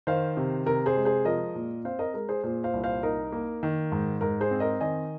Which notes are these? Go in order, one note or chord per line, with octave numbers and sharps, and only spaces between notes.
D#3 C5 F5
C3
C3 A#4
G#4 C5
G#3
G#4 C5
F3 A#4 D#5
A#2
C4 C5 F5
A#4 D#5
G#3 A#4
G#4 C5
A#2 G#4 C5
C5 F5
C2
C5 F5
D#4 A#4
A#3
D#3
G#2
G#2 A#4
G#4 C5
C4
A#4 D#5
D#3 D#5 G#5